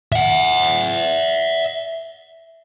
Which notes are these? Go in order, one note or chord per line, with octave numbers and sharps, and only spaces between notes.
E5 F#5